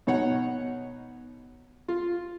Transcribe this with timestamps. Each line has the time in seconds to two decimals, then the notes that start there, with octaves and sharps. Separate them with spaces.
0.07 B2 D#4 C#5 F#5
1.88 F4